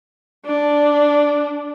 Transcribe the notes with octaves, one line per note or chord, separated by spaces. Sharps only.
D4